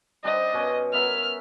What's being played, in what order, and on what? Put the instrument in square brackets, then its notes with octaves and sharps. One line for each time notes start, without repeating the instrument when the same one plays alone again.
[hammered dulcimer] G3 D4 C5 [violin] D#5
[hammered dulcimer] B2 C#4
[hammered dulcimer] B3 A#4 E5 [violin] F6